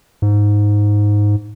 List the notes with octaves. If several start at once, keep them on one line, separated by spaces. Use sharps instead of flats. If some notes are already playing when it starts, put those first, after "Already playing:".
G#2